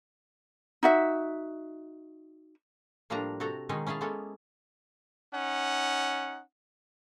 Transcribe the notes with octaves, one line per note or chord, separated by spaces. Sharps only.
D#4 F#4 E5
A2 F3 G3 A#3 D4 A#5
C3 F#4 A4 A#5
B2 D#3 G#3 C#4 D#4 G#4
C#4 E4 G#4 F5 A5
G#3 A#3 B3 C#4 E4 A4
C#4 D#4 F#5